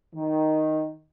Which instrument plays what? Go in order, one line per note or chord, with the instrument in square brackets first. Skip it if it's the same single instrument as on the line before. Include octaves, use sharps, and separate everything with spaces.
[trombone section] D#3